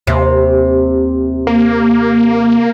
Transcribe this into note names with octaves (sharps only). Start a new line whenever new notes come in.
D#2 C3
A#3